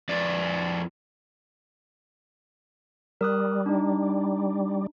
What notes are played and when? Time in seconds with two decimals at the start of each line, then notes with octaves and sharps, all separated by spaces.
0.09 F2 D5
3.21 G3 A#4 D#6 F#6
3.66 D4 D#4